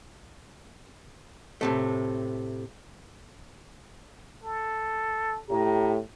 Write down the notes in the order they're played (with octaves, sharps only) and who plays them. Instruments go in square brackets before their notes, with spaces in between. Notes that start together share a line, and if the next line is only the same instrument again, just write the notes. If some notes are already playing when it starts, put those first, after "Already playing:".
[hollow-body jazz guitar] A2 C3 A3
[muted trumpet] A4
[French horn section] A2 G4 [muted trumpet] A#5